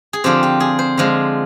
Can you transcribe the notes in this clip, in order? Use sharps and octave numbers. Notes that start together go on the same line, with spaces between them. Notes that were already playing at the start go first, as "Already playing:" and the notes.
G#4
D3 F3 C4 G4
G4
G#4
C5
D3 F3 G#3